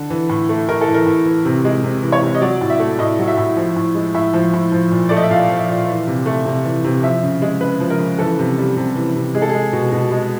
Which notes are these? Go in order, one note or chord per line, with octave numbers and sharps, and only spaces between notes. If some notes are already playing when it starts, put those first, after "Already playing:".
Already playing: D3 A4
E3
A2
A3
A2 A#4
A4
E3
A#4
A2
E3
C3
G#3
C3
E3
C#5
C3
D#5
F#3 D5
A2
E5
A3
A2 D#5
F#3
E5
A2
F3
A2
G#3
A2 E5
F3
A2
F3
A#2
A3 D5
D#5
E5
A#2 F5
F3
E5
A#2
E3
C3
A3
C3
E3
C3
F3 E5
C#3
G#3
C#3 B4
F3
A#4
C#3
E3 A4
C3
G3
C3
E3
C3
G#3 G#4
A4
G#3 G#4
B2
B2
G#3